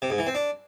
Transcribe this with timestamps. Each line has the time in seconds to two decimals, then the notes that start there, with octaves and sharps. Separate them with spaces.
0.02 C3
0.10 G#2
0.18 E3
0.27 C4
0.35 D4